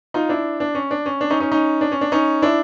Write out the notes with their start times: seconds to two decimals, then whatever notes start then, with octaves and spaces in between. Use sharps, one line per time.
0.14 D#4 F4
0.29 D4 E4
0.60 D4
0.75 C#4
0.91 D4
1.06 C#4
1.21 D4
1.30 C#4 D#4
1.40 C#4 D#4
1.51 C#4 D#4
1.81 D4
1.91 C#4
2.01 D4
2.12 C#4 D#4
2.42 D4 E4